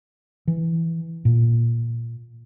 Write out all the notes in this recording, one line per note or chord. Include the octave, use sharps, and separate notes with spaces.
E3
A#2